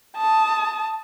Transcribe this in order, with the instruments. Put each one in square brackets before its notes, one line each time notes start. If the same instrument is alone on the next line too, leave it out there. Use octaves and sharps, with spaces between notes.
[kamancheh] A5 D#6